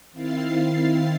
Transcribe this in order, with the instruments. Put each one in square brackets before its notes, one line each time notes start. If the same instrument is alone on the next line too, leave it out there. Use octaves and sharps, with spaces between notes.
[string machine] D#3 C4 E4 F5 A6 C7